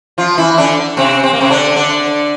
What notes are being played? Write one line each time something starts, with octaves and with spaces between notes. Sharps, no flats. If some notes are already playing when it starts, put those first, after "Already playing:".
F3 F4
E3 E4
D3 D4
C3 C4
C4
A#3
C3 C4
D3 D4
D3 D4